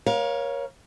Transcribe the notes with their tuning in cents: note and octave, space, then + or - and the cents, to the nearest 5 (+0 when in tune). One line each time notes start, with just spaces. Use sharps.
A#4 +30 C#5 +0 F5 +0